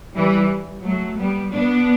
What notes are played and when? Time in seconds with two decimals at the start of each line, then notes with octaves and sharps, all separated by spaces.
0.15 E3 G3
0.83 F#3 A3
1.18 G3 B3
1.51 B3 D4